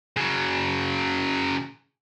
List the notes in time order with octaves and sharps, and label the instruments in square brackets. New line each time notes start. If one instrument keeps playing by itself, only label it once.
[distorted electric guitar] C#3 F#3